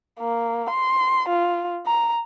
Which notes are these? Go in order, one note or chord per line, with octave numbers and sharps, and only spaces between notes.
A#3
C6
F4
A#5